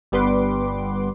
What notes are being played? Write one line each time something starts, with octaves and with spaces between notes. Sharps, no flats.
G1 G3 B3 B4 C6 D6